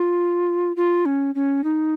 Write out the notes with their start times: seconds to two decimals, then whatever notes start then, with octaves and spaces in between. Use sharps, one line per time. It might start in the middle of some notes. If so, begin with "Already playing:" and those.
Already playing: F4
0.76 F4
1.05 C#4
1.35 C#4
1.64 D#4